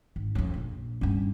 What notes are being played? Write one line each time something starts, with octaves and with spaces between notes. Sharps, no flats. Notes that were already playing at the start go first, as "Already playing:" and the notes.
G#1
F2 C#4
A#1
G2 C#4